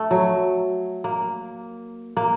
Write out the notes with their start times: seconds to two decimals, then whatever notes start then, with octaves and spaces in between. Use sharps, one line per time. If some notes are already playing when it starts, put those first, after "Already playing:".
Already playing: A3
0.11 F#3
1.04 A#3
2.17 A#3